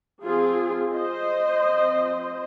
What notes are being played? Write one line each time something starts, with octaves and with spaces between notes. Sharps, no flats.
F3 C4 F4 G#4
C5 D#5
F3 C4